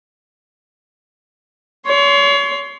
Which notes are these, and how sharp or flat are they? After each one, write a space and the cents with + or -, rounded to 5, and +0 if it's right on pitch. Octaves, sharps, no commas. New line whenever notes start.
C#5 +35 C6 +10